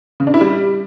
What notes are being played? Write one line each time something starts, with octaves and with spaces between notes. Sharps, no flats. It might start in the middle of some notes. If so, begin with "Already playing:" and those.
C#3
D4
E4
G3